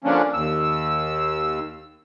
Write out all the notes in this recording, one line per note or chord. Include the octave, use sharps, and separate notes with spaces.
D3 F3 A#3 C#4 D4
D#2 E6